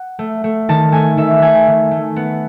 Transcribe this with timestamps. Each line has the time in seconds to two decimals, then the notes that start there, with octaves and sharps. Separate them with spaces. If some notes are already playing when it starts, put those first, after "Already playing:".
Already playing: F#5
0.19 A3
0.44 A3
0.69 D#3 A5
0.92 A3 G#5
1.17 D#3 E5
1.42 A3 G#5
1.67 D#3
1.91 A3
2.16 B3